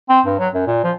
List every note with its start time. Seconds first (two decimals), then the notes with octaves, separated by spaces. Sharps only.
0.09 C4
0.26 G2
0.39 F#3
0.54 F#2
0.67 A#2
0.84 F3